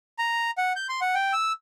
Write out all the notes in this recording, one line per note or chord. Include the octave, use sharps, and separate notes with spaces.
A#5
F#5
G6
C6
F#5
G5
E6